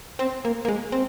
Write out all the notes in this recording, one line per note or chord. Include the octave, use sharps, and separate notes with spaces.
C4
A#3
A#3
G#3
C4